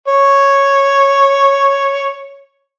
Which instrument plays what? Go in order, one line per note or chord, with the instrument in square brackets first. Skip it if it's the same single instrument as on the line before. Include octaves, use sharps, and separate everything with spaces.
[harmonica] C#5